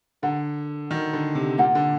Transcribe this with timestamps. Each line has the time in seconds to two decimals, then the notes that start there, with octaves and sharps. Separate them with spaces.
0.22 D3 A#4 F#5 A#5
0.90 D#3 D4 F#4 A#4
1.13 D3
1.35 C3
1.58 A#2 A#4 F#5 A#5
1.75 D3